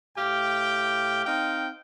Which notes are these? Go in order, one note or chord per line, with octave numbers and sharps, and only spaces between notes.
A2 G4 F5 G5
C4 D#4 F5 G5